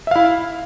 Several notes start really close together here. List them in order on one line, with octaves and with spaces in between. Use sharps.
E5 F5 E4